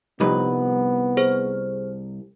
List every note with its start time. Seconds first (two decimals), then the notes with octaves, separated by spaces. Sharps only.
0.20 C2 F3 G3 B3 D#4 B4
1.17 G#4 C5 F6